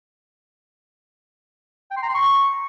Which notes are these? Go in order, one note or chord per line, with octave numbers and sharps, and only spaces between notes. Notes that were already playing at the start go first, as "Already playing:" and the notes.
G5
C6
A#5
C6
C#6